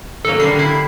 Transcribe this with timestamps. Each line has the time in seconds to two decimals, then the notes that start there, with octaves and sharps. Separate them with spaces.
0.25 D#3 F#3 A#3 A4
0.40 D3 D#3 G3 C7
0.55 D3 E4